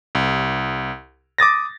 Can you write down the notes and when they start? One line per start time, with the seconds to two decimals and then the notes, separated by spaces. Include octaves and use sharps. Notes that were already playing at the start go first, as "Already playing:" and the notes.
0.15 C2
1.38 D6 D#6 A6 A#6